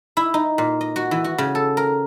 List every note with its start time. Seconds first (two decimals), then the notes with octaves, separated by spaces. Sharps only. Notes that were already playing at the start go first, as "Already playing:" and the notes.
0.17 E4
0.34 D#4
0.58 A#2
0.81 D#5
0.96 F#4
1.11 E3
1.24 F#4
1.38 C#3
1.55 A4
1.77 A#4